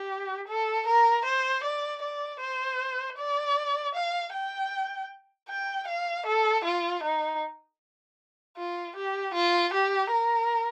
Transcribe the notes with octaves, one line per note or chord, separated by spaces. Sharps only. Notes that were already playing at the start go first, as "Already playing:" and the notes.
Already playing: G4
A4
A#4
C5
D5
D5
C5
D5
F5
G5
G5
F5
A4
F4
D#4
F4
G4
F4
G4
A#4